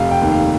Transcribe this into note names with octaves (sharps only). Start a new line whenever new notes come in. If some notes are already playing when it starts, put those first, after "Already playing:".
Already playing: F1 F5
G5
D#2 D#3
F5